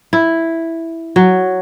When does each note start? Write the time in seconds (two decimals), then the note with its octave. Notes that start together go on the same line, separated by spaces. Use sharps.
0.13 E4
1.16 F#3